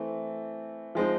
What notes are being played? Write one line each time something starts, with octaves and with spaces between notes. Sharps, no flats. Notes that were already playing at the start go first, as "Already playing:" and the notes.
Already playing: E3 A3 C4
F3 G#3 C4 D#4